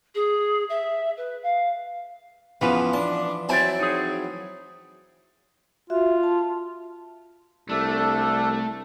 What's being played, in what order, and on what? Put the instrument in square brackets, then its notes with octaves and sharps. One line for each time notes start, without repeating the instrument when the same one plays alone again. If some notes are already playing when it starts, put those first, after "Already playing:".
[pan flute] G#4
E5
B4
F5
[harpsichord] E2 C#3 [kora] E3 F3 B4 [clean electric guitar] B3
[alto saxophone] D4 [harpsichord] A5
[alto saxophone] F#3 [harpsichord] C4 E4 [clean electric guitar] D5 G5 G#5
[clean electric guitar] D#4 G#4
[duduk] F4 [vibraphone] F#4 E5
[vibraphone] A5
[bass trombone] C2 [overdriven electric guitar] A3 [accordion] D4 A4